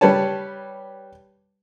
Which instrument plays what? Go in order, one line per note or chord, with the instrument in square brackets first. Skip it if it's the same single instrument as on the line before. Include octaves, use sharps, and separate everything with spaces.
[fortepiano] G3 B4 C#5 A5